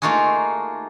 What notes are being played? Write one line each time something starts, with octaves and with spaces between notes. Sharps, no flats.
A3 A#3 D#4 F4 F#4 G#4